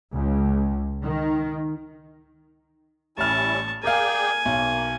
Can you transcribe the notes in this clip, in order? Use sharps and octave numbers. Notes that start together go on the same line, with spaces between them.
C#2
D#3
A1 G3 C#4 E4 A5 C#6 F6
G#4 A#4 D5 F5 G5 G#5
B1 A#3